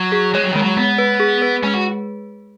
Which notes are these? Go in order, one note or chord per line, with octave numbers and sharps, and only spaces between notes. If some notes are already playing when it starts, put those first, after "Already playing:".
Already playing: F#3
G#4
G#3 C#5
F#3
D#3 G#3
F#3
G#3 B3
B4
G#4
B4
G#3 C#4
F#4